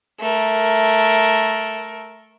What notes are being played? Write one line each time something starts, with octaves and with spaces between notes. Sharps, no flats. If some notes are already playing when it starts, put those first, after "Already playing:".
A3 A#4